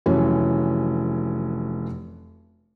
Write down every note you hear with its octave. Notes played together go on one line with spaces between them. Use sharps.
F1 E3 F#3 C#4